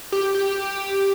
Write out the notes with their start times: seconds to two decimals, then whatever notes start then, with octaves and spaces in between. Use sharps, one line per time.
0.12 G4
0.35 G4